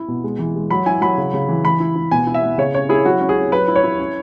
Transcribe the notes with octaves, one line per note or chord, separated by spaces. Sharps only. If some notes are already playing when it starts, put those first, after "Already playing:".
Already playing: E4
B2
G#3
E3
G#3
F#3 B5
E4 G#5
F#3 B5
C#3
C#3
E3
E3 B5
E4
E4
B2 G#5
E4
E5
B3
C#3 C#5
C#4 C#5
E4 G#4
F#3 F#4
C#4
G#4
C#4
F#3 B4
E4
C#5
E4
C#4